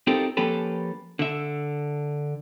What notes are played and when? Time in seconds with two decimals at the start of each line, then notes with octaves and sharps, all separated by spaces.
0.07 C4 D#4 F4 G4 A4 A#4
0.37 F3 A#3 C#4 G4 A4 B4
1.19 D3 E5